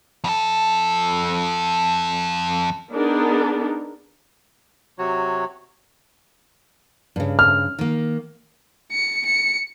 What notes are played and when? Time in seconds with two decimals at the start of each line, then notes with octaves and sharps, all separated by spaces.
0.24 F2 A4
2.91 B3 D4 D#4 G#4 A#4
4.99 C3 F#3 F#4 C#5
7.16 G2 C#3
7.39 F6
7.79 D#3 A#3
8.92 C#7
9.26 C#7